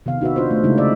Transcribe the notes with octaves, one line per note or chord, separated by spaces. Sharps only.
C3 D#3 B3 F5
D#4 F#4 B4 E5
D4 F4 F#4 C5
A3
C#3 G#3 A3 D#4 E4
D5 E5